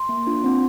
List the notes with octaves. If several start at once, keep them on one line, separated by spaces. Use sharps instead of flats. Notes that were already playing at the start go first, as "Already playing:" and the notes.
Already playing: C6
A#3
D4 F4
C4